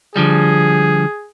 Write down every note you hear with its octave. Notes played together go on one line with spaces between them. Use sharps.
D3 F3 G3 G#4